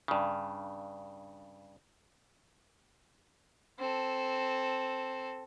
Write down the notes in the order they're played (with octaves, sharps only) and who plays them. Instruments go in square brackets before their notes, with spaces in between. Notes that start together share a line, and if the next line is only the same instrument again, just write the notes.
[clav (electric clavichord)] G2 C#3
[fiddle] C4 A4